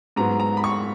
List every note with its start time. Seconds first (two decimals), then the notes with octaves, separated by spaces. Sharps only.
0.16 G#2 F#3 B3 A#5
0.40 A#5
0.57 B5
0.64 C#6